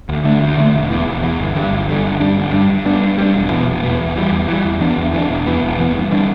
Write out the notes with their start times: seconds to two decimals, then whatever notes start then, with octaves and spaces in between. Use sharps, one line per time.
0.09 D2
0.24 D3 A3 D4
0.41 D2
0.57 D3 A3 D4
0.74 E1
0.90 E2 E3
1.06 E1
1.22 E2 E3
1.39 G1
1.55 G2 D3 G3
1.71 G1
1.88 G2 D3 G3
2.04 G1
2.20 G2 G3 D4
2.37 G1
2.53 G2 G3 D4
2.69 G2
2.85 G3 B3 D4
3.02 G2
3.18 G3 B3 D4
3.34 E1
3.51 E2 B2 B3
3.67 E1
3.83 E2 B2 B3
4.00 E2
4.15 E3 G3
4.32 E2
4.48 E3 G3
4.65 E2
4.80 E3 B3 D4
4.97 E2
5.13 E3 B3 D4
5.29 E1
5.46 E2 E3 B3
5.62 E1
5.78 E2 E3 B3
5.94 G2
6.12 E3 G3 D4